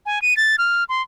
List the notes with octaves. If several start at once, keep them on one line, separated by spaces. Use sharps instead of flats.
G#5
D#7
A6
F6
C6